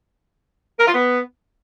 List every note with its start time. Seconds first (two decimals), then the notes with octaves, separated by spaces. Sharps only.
0.79 A#4
0.86 F4
0.94 B3